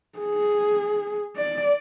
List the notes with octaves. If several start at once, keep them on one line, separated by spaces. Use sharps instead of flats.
G#4
D5